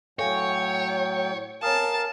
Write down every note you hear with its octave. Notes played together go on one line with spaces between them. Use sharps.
A2 F#3 A4 C#5 F5 G5 G#5
A#4 C#5 F5 G#5 A5 D#6